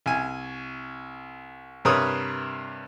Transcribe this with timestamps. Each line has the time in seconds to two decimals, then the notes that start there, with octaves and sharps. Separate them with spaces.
0.06 C2 G#5
1.85 G2 C3 A#4 B4 C#5 D#6